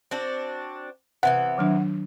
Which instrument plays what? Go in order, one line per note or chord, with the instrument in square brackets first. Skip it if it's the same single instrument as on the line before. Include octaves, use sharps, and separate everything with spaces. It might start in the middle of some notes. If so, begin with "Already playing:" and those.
[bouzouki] C4 D4 F#4
[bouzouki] C3 E3 B3 [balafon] B4 [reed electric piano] F#5
[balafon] D#3 F#3 D4